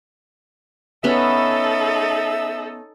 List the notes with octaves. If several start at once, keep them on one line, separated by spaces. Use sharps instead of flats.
B3 C#4 D#4 A4 E5 B5